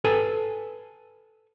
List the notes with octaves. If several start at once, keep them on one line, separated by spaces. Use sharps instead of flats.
A4 B4 G#5